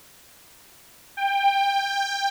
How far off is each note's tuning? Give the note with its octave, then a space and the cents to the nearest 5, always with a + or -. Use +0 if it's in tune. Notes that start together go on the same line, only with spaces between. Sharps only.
G5 +20